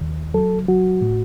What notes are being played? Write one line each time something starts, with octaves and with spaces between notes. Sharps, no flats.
D#2
F#3 A4
F#3 F#4
A2